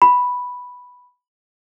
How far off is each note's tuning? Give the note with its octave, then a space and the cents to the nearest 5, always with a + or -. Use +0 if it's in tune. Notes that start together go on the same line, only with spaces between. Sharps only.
B5 +0